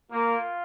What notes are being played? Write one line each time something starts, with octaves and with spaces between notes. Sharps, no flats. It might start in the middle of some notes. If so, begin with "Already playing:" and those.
A#3 F4